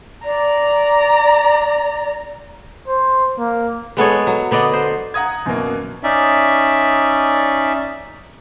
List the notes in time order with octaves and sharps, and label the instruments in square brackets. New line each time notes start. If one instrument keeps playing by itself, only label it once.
[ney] D5 [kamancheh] A#5
[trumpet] C5
A#3
[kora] G#3 B3 A4 C#5
F#3
D3 B3 D5 D#5
C5
[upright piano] F#5 A#5 D#6 G#6
F#2 B2 F#3 A#3
[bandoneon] C#4 D#4 D5 E5